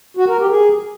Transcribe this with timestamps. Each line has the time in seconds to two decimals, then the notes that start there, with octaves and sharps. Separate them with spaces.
0.17 F#4
0.28 A#4
0.39 G4
0.50 G#4